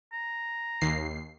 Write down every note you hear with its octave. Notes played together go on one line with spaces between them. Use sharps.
A#5
D#2 C7